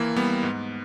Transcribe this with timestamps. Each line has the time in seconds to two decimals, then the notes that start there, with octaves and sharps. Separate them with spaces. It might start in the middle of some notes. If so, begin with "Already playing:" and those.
Already playing: D#2 E3 A#3
0.16 G3 B3
0.43 G#2